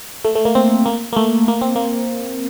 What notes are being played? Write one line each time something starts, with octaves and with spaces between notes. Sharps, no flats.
A3
A3
A#3
C4
A#3
A#3
A3
A#3
C4
A#3